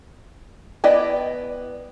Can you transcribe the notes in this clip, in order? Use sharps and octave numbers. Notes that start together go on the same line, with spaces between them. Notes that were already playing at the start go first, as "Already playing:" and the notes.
B3 E4 D5 D#5 G5